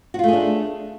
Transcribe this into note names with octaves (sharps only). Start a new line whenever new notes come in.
A3 D4 F4 F#4 G#4